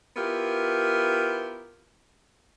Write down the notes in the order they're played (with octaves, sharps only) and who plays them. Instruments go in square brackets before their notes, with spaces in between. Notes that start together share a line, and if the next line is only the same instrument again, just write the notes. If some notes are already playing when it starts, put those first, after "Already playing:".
[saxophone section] B3 E4 F4 G4 A#4